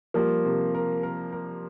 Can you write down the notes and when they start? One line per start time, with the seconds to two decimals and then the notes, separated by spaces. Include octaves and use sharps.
0.14 F3 G3 A#3
0.45 C3
0.74 A#4
1.03 A#4
1.32 A#4